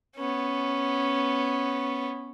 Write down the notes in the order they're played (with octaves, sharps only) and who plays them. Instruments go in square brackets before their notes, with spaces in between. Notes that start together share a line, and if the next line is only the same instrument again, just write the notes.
[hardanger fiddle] B3 C#4